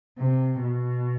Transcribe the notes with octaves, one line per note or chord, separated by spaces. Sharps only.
C3
B2